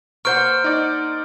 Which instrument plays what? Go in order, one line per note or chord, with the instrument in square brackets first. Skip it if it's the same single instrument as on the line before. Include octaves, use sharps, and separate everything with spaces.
[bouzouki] A#3 C5 F#5 [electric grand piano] C#6 G6 [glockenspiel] F6 D7
[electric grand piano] D#4 D5